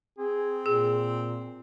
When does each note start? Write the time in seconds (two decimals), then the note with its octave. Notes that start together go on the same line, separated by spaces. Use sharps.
0.18 C4 G#4
0.66 A#2 G#4